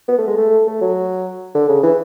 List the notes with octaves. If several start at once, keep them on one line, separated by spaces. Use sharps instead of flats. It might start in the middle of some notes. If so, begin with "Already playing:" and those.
B3
A3
G#3
A3
A3
F#3
D3
C#3
E3